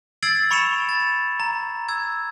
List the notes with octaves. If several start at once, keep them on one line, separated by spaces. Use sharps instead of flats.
E6 G#6 A6 C7 D7 F#7
B5 C#6 C#7 D7 E7 F7
A6
A#5
E6 G#6